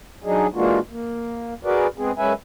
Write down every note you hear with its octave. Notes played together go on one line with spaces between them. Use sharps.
F#3 D4 D#4 G#4
E3 G#3 A#3 D4 F4 F#4
A#3
F#4 G#4 A#4 B4 D5
G#3 B3 C4 G#4
F#2 G#3 C#4 B4 E5 G#5